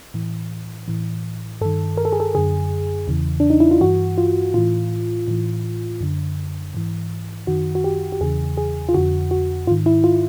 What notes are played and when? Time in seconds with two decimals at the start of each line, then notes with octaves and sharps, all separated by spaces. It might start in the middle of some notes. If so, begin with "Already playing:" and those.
0.14 A2 E3
0.88 A2 E3
1.61 G2 D#3 A4
1.97 A#4
2.05 A4
2.12 G#4
2.20 A4
2.35 F#2 D3 G#4
3.08 E2 C#3 E3
3.40 D4
3.50 D#4
3.60 E4
3.71 F4
3.81 G2 E3 F#4
4.18 F4
4.54 A2 E3 F4
5.28 A2 E3
6.01 F#2 D3
6.75 G#2 E3
7.47 F#2 D#3 F#4
7.75 F#4
7.84 G4
8.12 G4
8.21 E2 C#3 E3 G#4
8.57 G#4
8.89 F4
8.94 F2 D3 F#4
9.31 F#4
9.67 G#2 D#3 F4
9.86 E4
10.04 F4